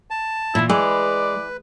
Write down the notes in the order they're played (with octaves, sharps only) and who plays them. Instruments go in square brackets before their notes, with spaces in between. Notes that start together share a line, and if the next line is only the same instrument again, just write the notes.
[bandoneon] A5
[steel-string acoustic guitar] A#2 E3 [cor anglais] E4
[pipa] E3 [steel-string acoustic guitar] G#3 [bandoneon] B4 [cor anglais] D5